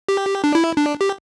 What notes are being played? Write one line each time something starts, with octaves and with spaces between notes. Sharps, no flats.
G4
D4
E4
D4
G4